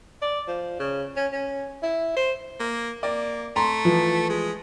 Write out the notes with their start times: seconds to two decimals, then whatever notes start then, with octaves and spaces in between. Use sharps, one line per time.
0.22 D5
0.47 F3
0.79 C#3
1.16 C#4
1.33 C#4
1.83 E4
2.17 C5
2.60 A#3
3.03 A#3 D5
3.56 A3 A#5 C6
3.85 E3 F3
4.30 G#3